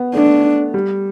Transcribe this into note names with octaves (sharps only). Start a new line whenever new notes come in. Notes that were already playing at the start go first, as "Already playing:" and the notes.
Already playing: B3
A3 D4
G3